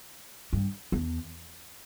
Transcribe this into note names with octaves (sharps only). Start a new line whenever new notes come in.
G2
E2